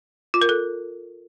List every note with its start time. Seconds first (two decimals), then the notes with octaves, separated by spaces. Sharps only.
0.34 F4
0.41 A#4
0.49 A4